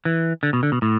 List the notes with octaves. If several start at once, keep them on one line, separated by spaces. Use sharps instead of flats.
E3
D3
B2
D3
B2
A2